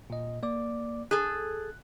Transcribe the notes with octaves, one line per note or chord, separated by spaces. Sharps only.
A#2 D#5
A#3 D5 D6
G#4 A4 F#6